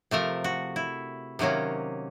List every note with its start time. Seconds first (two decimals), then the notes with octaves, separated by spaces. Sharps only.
0.11 C3 F3 A3 A#4
0.44 F#4
0.76 E4
1.39 C3 D#3 F#3 A#3 C#4